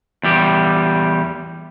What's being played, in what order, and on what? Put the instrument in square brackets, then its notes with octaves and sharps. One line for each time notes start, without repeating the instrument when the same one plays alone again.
[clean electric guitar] E2 G3 G4